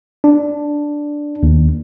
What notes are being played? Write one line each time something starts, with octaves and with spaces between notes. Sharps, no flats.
D4
D#2